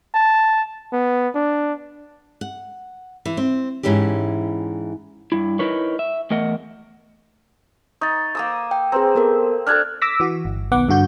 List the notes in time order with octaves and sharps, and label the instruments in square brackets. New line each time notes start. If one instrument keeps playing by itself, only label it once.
[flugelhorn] A5
B3
D4
[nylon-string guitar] F#5
E3
C4
G#2 E3 C#4 E4 G4
[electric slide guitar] G2 E4
D#4 E4 A#4 B4 C#5
E5
E2 A3 A#4 D#5 F#5
[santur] D#4 [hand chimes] C#6 A6
[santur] A#3 D#6 E6
[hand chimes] G5
[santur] C4 [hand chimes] G#4 B4 A#5
[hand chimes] B3 A4 A#4
[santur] D4 A4 [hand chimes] F6 F#6 G#6
[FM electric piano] D6 E6 A#6 B6
E3 F#4
G1
B1 D#3 B3 F#5 D6
G2 D3 F#4 G6